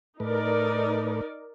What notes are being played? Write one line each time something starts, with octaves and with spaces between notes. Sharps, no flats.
A2 A3 D#4 A#4 B4 D5